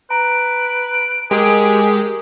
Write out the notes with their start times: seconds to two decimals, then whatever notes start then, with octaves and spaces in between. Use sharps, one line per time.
0.10 B4 A#5 D7
1.31 G#3 G4 G#4 A#4 D#6